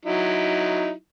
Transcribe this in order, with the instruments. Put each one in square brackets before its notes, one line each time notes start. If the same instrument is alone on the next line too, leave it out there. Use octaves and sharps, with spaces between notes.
[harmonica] F#3 D#4 E4